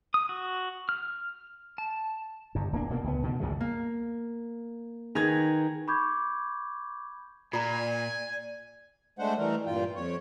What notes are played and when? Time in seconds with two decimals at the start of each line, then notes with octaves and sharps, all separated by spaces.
0.14 D#6
0.29 F#4
0.89 F6
1.78 A5
2.55 G1 G2
2.73 D1 A#3 D4
2.89 D2 B2 A#3
3.04 C#2 B3
3.23 B2 D3 D#3
3.40 C#2 F#2 A#2 G#3
3.60 A#3
5.15 D#3 G#4 B4 A#5 G#6
5.88 B5 C#6 D6 G6 G#6
7.53 A#2 F4 D5 G#5 A#5
9.19 G#3 A3 D4 C5 F#5
9.38 E3 G3 A3 A#4
9.66 G2 A#2 F4 G5
9.95 F2 C#5